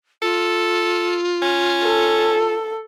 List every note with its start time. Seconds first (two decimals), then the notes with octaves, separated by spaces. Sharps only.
0.22 F4 A4
1.42 C#4
1.84 A4